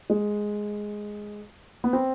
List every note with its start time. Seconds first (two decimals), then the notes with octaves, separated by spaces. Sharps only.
0.10 G#3
1.84 B3
1.93 C4